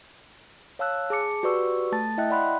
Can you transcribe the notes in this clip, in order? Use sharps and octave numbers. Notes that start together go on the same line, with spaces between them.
C#5 F5 A5 E6 F#6
G#4 A5 D6 C#7
F#4 G4 B4 D5 C#6 E6
A3 A5 A6
E4 D#5 E5 G5 F#6
D5 F#5 B5 C6 F#6